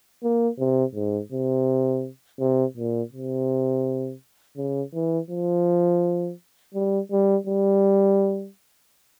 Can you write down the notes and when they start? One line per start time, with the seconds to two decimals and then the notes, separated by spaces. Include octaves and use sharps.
0.23 A#3
0.59 C3
0.95 G#2
1.32 C3
2.40 C3
2.77 A#2
3.12 C3
4.57 C#3
4.94 E3
5.31 F3
6.74 G3
7.12 G3
7.47 G3